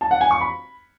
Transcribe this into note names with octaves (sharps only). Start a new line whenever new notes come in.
A5
F#5
G#5
C#6
B5